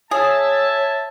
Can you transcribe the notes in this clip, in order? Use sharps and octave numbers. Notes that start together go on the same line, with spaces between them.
G#4 C#5 E5 A5